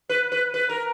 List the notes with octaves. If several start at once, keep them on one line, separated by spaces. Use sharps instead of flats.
B4
B4
B4
A#4